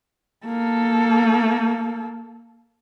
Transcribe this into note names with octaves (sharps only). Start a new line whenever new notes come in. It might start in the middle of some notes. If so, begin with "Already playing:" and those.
A#3 A4